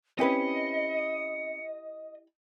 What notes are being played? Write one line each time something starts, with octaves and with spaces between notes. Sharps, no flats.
C4 C#4 E4 G4 B4 D#5 C#7